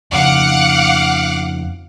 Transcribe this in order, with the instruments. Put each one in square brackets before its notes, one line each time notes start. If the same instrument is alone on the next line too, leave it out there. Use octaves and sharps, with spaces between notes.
[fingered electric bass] F2 C#3 [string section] F5 F#5 D6